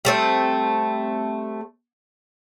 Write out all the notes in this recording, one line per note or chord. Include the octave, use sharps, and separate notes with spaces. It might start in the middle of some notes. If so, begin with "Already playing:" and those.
G3 A3 C4